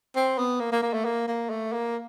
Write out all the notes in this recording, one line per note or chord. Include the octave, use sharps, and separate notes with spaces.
C4
B3
A#3
A#3
A#3
A3
A#3
A#3
A3
A#3